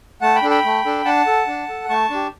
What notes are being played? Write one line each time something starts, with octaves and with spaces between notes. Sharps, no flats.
A3 F#5 A5
G5 B5
D4 A4
G5 B5
A3
D4 A4
D4 F#5 A5
A4
D4
A4
A3 A5 C#6
D4 G4